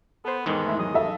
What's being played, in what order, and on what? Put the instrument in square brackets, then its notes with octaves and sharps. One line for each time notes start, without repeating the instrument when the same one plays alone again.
[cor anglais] B3 [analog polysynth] A4 C5
[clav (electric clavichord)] E2 G#2 D#3 [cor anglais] G#3
[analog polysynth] A3 E4
[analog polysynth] F#3 G#4 [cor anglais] D#5
[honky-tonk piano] A4 E5 F5